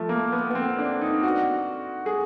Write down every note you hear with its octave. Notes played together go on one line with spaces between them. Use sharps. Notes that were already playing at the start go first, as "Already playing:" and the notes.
Already playing: F3 A3
A#3
B3
B3
C4
D4
D#4
F#4
G#4